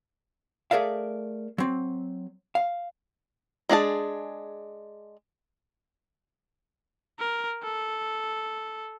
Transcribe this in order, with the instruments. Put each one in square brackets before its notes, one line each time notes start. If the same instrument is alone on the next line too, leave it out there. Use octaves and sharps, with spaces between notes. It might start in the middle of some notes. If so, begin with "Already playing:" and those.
[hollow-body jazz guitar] A3 G#4 A#4 D5 E5 F5
F#3 C4
F5
[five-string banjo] G#3 D4 G#4 A5
[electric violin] A#4
A4